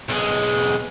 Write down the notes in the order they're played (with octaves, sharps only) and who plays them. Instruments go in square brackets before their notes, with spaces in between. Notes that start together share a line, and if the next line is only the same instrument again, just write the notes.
[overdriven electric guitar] B1 G#3